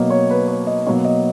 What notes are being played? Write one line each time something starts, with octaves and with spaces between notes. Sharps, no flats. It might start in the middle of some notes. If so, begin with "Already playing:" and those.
Already playing: B2 F#3 A#3 D#5
C#5
B4
C#5
D#5
B2 F#3 A#3 C#5
D#5